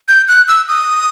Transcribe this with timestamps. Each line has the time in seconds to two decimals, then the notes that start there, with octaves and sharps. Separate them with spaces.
0.08 G6
0.28 F#6
0.48 E6
0.68 D#6